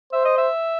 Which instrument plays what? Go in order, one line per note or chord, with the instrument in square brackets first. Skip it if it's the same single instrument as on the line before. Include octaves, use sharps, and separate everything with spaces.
[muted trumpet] C5 [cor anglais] E5
[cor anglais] D#5
E5